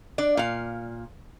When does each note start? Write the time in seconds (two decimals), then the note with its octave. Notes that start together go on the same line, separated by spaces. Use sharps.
0.18 D4 D5
0.37 A#2 F5